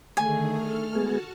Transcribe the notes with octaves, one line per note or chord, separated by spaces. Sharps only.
D3 D#3 A3 G#4 G#5
A4 F6
G#3 B3 F#4 G#4 A5